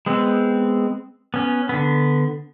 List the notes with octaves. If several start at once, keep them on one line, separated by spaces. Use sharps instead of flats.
G#3 B3 C4
B3 C#4
D3 B3